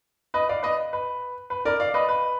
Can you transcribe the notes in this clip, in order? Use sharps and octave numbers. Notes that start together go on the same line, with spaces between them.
B4 D#5
D5 F5
B4 D#5
B4
B4
A#4 D5
D5 F5
B4 D#5
B4